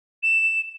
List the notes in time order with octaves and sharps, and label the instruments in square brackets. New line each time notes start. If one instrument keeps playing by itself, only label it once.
[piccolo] E7